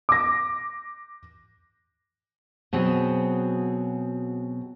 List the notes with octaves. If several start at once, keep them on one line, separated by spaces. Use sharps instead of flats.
D6 A#6
B2 F#3 C4 G#4